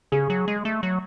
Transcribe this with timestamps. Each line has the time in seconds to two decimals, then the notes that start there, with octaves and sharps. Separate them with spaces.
0.12 C#3 G#4
0.30 F#3
0.48 G#3
0.65 A3
0.83 F#3